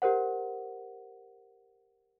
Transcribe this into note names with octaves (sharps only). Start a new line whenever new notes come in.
G4 A#4 C5 F#5